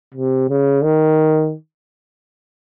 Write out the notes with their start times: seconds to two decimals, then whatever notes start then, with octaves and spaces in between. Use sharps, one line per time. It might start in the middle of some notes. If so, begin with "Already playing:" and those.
0.14 C3
0.49 C#3
0.83 D#3